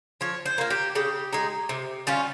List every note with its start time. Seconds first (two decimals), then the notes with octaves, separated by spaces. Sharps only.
0.21 F3 C#5
0.46 C5
0.58 A#3 F4
0.70 G4
0.95 C#3 G4
1.33 G#3 D#4
1.69 C3
2.07 G3 C#4 F4